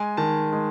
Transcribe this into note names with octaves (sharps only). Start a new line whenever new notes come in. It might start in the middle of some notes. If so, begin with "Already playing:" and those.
Already playing: G#3 G#5
D#3 A5
G#3